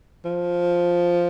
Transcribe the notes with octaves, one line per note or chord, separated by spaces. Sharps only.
F3